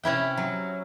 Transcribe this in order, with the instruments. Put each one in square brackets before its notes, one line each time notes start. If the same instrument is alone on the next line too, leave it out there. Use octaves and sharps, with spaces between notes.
[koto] C3 C#4 E4 G5
F#3